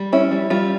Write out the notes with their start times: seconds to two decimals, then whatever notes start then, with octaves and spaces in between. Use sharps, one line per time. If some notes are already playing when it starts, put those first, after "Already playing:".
Already playing: G3
0.12 C#4 E4
0.31 G3
0.50 G3 F4